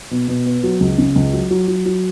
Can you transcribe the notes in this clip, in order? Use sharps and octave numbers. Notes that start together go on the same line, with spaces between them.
B2
B2
B3
F#3
C#2
C#3
C#2
F#3
F#3
F#3
F#3